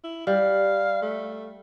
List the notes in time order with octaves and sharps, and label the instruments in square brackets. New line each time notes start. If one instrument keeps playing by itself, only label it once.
[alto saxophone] E4
[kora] G3 [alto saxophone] F5
[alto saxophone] A3